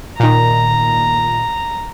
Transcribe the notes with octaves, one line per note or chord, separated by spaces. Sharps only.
A#2 D#3 A#5